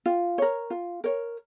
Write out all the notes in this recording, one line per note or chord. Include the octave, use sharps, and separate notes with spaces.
F4
A#4 C#5
F4
A#4 C#5